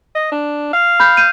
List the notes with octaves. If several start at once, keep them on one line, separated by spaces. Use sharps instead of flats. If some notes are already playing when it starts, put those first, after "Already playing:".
D#5
D4
F5
B5 G6
G6 D#7